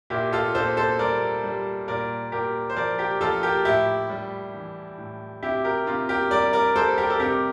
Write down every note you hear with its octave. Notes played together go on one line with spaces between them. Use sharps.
A#2 E4 G4
F4 A4
A#2 A4 C5
A4 C5
G3 A#4 D5
G3
A#2 A#4 D5
A#2 G4 A#4
C5
F3 A#4 D5
G4 A#4
F3 F4 A4
G4 A#4
A2 E4 G4
G3
E3
A2
C3 E4 G4
G4 A#4
C3 F4
G4 A#4
G3 A#4 D5
A#4 D5
G3 A4 C5
G4 A#4
A4
C3 G4 A#4